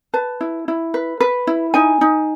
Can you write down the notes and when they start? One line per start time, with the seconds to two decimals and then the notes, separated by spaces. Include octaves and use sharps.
0.14 B4 A5
0.41 E4
0.68 E4
0.94 B4
1.20 B4
1.47 E4
1.74 D#4 G#5
2.01 D#4